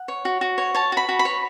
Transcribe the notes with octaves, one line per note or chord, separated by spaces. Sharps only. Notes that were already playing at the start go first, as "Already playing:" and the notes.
Already playing: F#5
C#5
F#4
F#4
C#5
C#5 A5
F#4 B5
F#4
B5
C#5